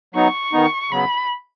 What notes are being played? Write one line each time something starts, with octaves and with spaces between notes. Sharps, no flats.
F#3 B3 D#4 C#6
D#3 B3 D#4
C#3 F#3 B3 B5